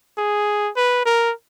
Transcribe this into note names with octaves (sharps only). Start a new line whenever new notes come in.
G#4
B4
A#4